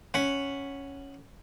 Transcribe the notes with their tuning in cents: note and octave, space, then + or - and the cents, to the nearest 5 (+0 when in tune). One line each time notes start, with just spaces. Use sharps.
C#4 +0 F#5 +0 B5 +0